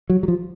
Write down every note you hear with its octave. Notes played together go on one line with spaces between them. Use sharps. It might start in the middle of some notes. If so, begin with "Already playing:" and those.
F#3
F#3
F3